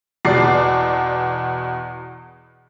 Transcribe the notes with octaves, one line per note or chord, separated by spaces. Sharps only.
E2 B2 D5 C7